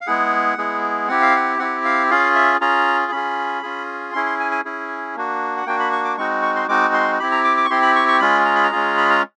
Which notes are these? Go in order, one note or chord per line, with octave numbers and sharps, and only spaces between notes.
F5
G#3 B3 E4 G#4 F#5
G#3 B3 E4 G#4
C4 E4 G4 F#5
F5
F#5
C4 E4 G4 F#5
F5
C#4 F4 G#4 F5
E5
C#4 F4 G#4 A#5
C#4 F4 G#4 B5
C#4 F4 G#4
C#4 E4 G#4 C6
C6
G#5
G#5
C#4 E4 G#4
A#3 D4 F#4
F#5
A#3 D4 F#4 G5
B5
C#6
D6
G#3 C4 D#4 F#4 C#6
C#6
C6
G#3 C4 D#4 F#4 D6
C6
C4 E4 G4 B5
A#5
D6
D6
C#6
C4 E4 G4 C6
B5
C#6
C#6
G#3 C#4 F4 G#4 B5
A#5
B5
A#5
G#3 C#4 F4 G#4
B5
A#5